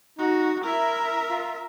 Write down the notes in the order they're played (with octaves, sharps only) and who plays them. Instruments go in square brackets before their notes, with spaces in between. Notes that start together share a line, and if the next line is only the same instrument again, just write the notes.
[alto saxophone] D#4 [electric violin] F#4
[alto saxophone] E4 [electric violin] A#4 E5
[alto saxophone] F4